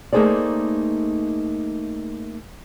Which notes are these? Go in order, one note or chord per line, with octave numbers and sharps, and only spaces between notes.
A3 A#3 D#4 G#4 C5 D5